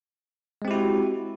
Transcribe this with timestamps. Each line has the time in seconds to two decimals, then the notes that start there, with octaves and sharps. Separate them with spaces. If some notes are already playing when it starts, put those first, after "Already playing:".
0.62 G#3
0.65 C4
0.68 G4
0.71 E4
0.74 F#4